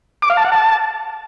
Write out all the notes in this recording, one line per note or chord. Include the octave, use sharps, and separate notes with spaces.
D6
F5
A5
F#5
A5